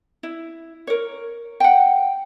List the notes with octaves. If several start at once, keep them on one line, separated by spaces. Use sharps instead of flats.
E4
A#4 C#5
F#5 G5